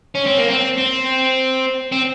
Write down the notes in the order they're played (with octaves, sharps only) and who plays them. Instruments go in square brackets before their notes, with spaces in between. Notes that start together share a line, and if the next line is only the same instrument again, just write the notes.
[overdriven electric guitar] C#4
C4
A#3
C4
C4
C4